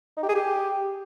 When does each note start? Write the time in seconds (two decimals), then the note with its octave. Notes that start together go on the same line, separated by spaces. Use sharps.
0.17 D#4
0.23 G4
0.29 G#4
0.35 G4